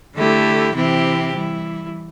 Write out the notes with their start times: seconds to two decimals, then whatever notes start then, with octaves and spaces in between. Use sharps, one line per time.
0.14 D3 A3 E4 G4
0.73 C3 E3 C4 E4 G4
1.31 E3 G3 E4